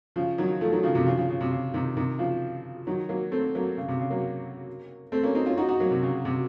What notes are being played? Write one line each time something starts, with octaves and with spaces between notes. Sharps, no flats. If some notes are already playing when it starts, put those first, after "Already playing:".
C#3 F3
D#3 F#3
F3 A3
D#3 F#3
C#3 F3
C3 D#3
C#3 F3
C#3 F3
C#3
C3
C#3
C3 D#3
C3 D#3
C#3 F3
D#3 F#3
F#3 A#3
A3 C4
F#3 A#3
C#3
C3
C#3
F#3 A#3
A3 C4
A#3 C#4
C4 D#4
C#4 F4
D#4 F#4
D#4 F#4
F#3 A#3
C3
C#3
C3